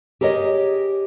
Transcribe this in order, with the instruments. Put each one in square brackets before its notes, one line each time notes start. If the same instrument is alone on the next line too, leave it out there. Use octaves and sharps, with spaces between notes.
[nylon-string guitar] G4 G#4 A#4 C#5 D#5